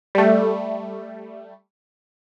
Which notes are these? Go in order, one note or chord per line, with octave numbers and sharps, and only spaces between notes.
G3 A3